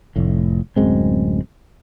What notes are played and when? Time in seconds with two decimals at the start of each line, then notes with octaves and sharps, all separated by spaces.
0.16 F1 A2
0.76 D1 F#2 G#3 C4